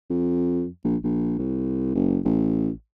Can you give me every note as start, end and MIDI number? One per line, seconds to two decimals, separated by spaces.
0.10 0.67 41
0.84 0.96 34
1.03 1.36 34
1.38 1.95 36
1.95 2.19 30
2.25 2.70 33